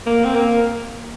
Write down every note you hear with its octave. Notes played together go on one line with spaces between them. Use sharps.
A#3
C4
A#3